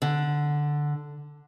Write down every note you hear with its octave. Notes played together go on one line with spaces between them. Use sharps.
D3